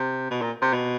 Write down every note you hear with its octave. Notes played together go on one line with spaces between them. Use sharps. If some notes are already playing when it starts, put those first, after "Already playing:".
Already playing: C3
B2
A#2
C3
B2